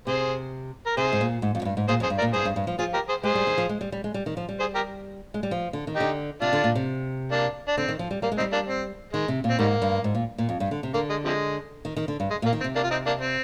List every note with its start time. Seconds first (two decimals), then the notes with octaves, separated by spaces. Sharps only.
0.07 C3 G#4 C5
0.86 A#4
0.97 C3 G#4 C5
1.12 G#2
1.21 A#2
1.42 G#2
1.55 F2
1.62 G#2
1.65 G2
1.77 G#2
1.88 A#2 G#4 C5
2.00 F2 G#4 C5
2.10 G2
2.18 A#4 D5
2.22 A#2
2.33 G2 G#4 C5
2.45 G2
2.56 G2
2.67 F3
2.79 F3 F4 G#4
2.94 G4 A#4
3.08 G#4 C5
3.23 G#3 G#4 C5
3.35 G3
3.47 D#3
3.58 F3
3.69 G#3
3.81 G3
3.92 G3
4.04 G#3
4.14 G3
4.26 D#3
4.37 F3
4.49 G3
4.59 G#4 C5
4.75 G4 A#4
5.34 G#3
5.43 G3
5.51 F3
5.73 D3
5.87 D#3
5.96 D3 D#4 G4
6.41 C3 D4 F4
6.53 D3
6.64 A#2
6.75 C3
7.31 A#3 D4
7.68 D4
7.77 D3 C4
7.89 D#3
7.99 F3
8.11 G3
8.22 G3 A#3
8.32 G#3
8.38 G3 C4 D#4
8.52 A#3 D4
8.68 C4
9.13 D#3 G#3
9.28 C3
9.44 A#2
9.50 C4
9.59 G#2 D#3 G3 A#3
9.82 G2
10.04 G#2
10.15 A#2
10.38 A#2
10.49 F2
10.60 G2
10.71 D3
10.83 C3
10.94 D3 A#3
11.10 G#3
11.25 C3 F3 G#3
11.85 D#3
11.97 D#3
12.08 D3
12.20 G2
12.30 G#3
12.42 A#2
12.46 A#3
12.53 D#3
12.61 C4
12.64 C3
12.76 A#3 D4
12.83 F4
12.90 C4 D#4
13.06 A#3 D4
13.21 C4